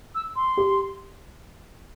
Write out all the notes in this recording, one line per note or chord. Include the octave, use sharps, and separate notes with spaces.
E6
C6
G4